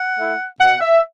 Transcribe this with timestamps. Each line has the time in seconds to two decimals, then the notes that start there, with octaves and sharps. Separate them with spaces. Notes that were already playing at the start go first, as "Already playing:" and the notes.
Already playing: F#5
0.20 A3 E4
0.61 B2 F#5
0.81 E5